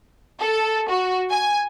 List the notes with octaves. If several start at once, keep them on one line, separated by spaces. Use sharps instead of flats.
A4
F#4
G#5